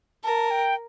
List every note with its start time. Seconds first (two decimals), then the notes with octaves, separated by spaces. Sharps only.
0.24 A#4 A5
0.51 G5